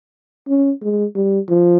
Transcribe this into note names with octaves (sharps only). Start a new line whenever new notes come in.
C#4
G#3
G3
F3